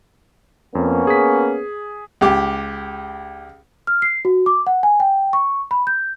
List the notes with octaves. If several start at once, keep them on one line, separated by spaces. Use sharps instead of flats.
F2 A#3 B3 C#4
G#4 B6
C#2 G4
F6
C7
F#4
D6
F#5
G#5
G5
C#6
B5
G6